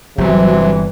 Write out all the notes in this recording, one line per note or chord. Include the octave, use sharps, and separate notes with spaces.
G1 C3 E3 F#3 G3